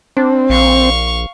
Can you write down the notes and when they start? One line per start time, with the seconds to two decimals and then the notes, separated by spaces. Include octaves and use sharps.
0.17 C4 D4
0.50 A#1 F5 C#6